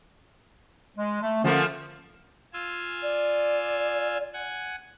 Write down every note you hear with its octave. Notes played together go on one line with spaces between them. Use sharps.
G#3
A3
D3 F3 A3 A#3 C#4
F4 G#5 E6
D5
F#5 G#5